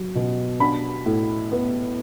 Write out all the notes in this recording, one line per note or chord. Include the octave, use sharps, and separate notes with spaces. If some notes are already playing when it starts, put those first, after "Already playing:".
Already playing: F#3
B2
D4 B5
A2
B3